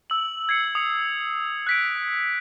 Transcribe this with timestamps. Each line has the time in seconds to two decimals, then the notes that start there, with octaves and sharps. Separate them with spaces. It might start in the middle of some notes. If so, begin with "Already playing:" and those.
0.10 E6 F#7
0.49 G#6 C7 C#7
0.75 D#6 C#7
1.67 F#6 B6 D7